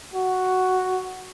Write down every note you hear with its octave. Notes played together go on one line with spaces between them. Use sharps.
F#4